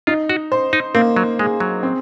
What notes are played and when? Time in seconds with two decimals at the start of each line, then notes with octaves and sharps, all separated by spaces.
0.07 D#4 F4
0.29 F#4
0.52 C5
0.73 D#4
0.95 A#3 C4
1.16 F#3
1.39 G#3 G#4
1.60 F#3
1.83 C4